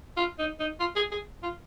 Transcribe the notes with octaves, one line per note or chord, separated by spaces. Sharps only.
F4
D#4
D#4
F4
G#4
G#4
F4